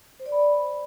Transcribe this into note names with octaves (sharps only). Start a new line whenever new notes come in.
C5
D5
B5